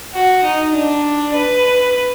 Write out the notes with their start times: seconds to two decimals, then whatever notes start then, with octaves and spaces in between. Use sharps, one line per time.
0.14 F#4
0.44 D#4
0.74 D4
1.34 B4